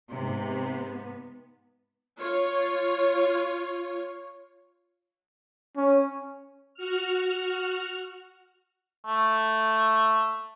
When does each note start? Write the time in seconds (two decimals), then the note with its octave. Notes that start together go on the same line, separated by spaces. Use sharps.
0.12 G#2 C3 B3
2.19 F4 C#5
5.77 C#4
6.75 F#4 F6
9.06 A3